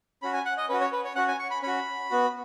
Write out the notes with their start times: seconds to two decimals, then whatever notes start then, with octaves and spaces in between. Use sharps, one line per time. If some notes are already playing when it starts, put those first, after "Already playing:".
0.22 C#4 F#4 B5
0.34 G#5
0.45 F#5
0.57 D#5
0.69 C#4 F#4 B4
0.81 C#5
0.92 B4
1.05 C#5
1.16 C#4 F#4 F#5
1.28 G#5
1.39 C#6
1.51 B5
1.62 C#4 F#4 B5
2.10 B3 F#4